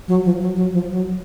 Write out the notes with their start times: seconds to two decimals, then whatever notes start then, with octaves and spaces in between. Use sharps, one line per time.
0.08 F#3
0.24 F3
0.40 F#3
0.56 F#3
0.73 F3
0.90 F#3